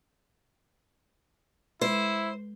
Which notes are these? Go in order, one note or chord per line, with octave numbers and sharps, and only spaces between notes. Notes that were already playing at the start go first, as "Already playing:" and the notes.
G#3 E4 C5